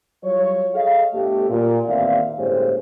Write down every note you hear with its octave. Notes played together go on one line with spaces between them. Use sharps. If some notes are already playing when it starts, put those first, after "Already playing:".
F#3 G3 F4 C#5
G#4 A4 D#5 F5
G1 A3 G4
A#2
A1 D#2 C4 D5 E5 F5
G1 A2 G#3 C#4 G4 C5